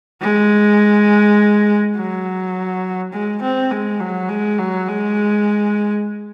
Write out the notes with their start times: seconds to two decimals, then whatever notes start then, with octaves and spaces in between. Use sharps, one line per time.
0.22 G#3
1.97 F#3
3.13 G#3
3.42 C4
3.71 G#3
4.00 F#3
4.29 G#3
4.59 F#3
4.88 G#3